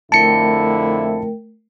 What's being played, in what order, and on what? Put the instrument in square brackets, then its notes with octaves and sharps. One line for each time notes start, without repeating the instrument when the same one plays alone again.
[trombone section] F2 D3 E4 [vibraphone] A3 A#4 G5 [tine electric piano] A5 C#7